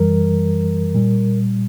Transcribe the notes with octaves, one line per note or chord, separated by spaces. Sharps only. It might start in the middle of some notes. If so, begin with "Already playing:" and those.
Already playing: F#2 E3 G3 A#4
A#2 G3